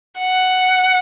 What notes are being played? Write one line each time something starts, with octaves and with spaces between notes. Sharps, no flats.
F#5